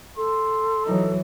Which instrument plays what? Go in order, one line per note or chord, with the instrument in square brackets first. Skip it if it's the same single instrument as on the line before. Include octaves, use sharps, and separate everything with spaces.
[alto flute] A4 [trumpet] C6
[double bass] E3 F#3 [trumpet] D#4